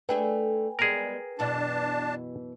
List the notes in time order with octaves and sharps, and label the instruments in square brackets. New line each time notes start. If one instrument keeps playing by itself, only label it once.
[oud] A3 D4 G#4 [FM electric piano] B4 G5 G#5
[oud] G3 G#3 B3 [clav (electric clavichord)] G#4 A#4
[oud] F#2 B2 E3 [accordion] D4 A5